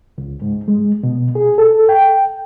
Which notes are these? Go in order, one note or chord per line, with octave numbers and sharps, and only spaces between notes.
C#2
G#2
G#3
B2
G#4
A4
G5